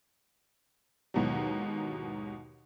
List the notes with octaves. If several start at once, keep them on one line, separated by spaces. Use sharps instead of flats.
D#2 G#2 B2 E3 F#3